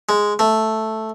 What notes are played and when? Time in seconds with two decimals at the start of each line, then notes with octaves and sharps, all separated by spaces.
0.09 G#3
0.39 A3